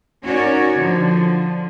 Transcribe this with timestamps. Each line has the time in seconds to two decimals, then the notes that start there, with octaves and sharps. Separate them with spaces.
0.24 C#4 D#4 F#4 A#4 C#5 D5
0.74 D3 F3